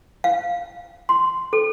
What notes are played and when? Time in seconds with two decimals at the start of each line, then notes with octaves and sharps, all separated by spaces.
0.24 F5
1.09 C6
1.53 A4